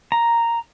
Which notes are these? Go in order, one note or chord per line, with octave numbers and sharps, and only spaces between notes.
A#5